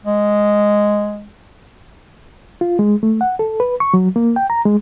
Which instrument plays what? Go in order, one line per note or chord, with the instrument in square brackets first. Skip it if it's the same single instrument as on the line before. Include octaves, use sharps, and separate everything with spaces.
[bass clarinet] G#3
[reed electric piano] F4
G#3
A3
F#5
A4
B4
C#6
F#3
A#3
G5
A#5
G#3